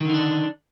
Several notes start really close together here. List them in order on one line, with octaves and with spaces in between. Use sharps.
D#3 D3 D#4 D4